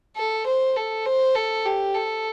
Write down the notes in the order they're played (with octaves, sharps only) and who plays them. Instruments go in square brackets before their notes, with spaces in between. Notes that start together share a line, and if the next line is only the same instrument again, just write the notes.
[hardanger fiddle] A4
C5
A4
C5
A4
G4
A4